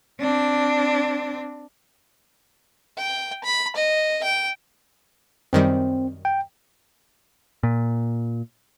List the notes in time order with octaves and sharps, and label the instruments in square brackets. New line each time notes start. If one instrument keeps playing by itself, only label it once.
[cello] C4 D4
[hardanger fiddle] G5
B5
D#5
G5
[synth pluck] F#2 D#3 G3 [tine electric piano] C4
[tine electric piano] G5
[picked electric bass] A#2